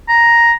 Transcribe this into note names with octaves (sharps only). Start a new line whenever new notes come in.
A#5